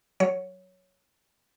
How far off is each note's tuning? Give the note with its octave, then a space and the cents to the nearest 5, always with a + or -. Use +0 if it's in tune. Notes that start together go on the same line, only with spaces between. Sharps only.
F#3 +0 C#5 +0